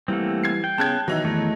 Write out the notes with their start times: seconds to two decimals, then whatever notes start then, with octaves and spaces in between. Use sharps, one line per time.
0.08 E3 G3 A3 A#3 C4 G4 F#5
0.43 G#6 C7
0.64 G5
0.78 C#3 B3 A5 F#6 G#6
1.08 B2 D#3 E3 F#3 B3 D#4 E5
1.25 E2 A3